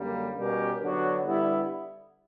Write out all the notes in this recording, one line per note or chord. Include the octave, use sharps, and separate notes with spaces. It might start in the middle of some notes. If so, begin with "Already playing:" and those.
Already playing: F#2 D3 G3 A#3
B2 G3 C#4 G4 A#4
D3 F#3 B3 D4 F#4
D3 G3 B3 E4